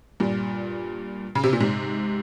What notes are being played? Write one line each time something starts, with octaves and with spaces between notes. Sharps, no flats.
G2 A#2
C#3
C3
A#2
G#2 C3